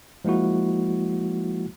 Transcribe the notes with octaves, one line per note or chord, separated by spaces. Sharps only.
F3 G#3 A#3 E4 F#4